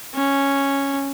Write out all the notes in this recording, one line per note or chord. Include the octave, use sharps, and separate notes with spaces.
C#4